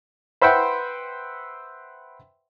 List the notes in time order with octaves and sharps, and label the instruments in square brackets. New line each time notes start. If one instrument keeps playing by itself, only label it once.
[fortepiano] B4 C5 E5 F#5 G5 C6